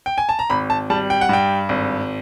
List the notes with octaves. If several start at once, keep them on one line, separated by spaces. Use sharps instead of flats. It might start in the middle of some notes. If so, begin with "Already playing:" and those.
G5
G#5
A5
A#5
G#1 B5
A5
G3 A5
G5
F#5
G2 G5
G#1